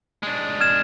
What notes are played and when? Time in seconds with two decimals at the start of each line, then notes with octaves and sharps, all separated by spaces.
0.23 G#3 D4
0.61 F6 G#6 E7